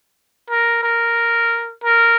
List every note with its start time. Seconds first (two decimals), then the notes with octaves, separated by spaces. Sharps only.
0.50 A#4
0.83 A#4
1.84 A#4